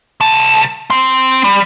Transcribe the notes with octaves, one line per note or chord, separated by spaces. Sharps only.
C2 A5
C4 C6
G3